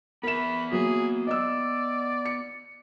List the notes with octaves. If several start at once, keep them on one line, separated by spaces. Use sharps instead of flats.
B3 A#4 E5 B5 E7
F#3 A#3 G#4
D5 D#5 E6
C#7